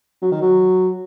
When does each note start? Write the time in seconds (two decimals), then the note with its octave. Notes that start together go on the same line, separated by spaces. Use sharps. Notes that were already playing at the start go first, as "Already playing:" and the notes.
0.22 F#3
0.32 D#3
0.41 F#3